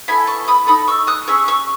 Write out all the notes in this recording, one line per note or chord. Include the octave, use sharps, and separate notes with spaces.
B3 E4 A4 G#5 B5
A5 C#6
B5 D#6
D#4 A4 B5 D#6
C#6 E6
D#6 F#6
C#4 G#4 C#6 E6
C#6 E6